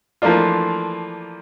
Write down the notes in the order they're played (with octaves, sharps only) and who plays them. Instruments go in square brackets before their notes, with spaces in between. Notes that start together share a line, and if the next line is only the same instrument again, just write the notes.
[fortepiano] E3 F3 A3 A#3 D4 F4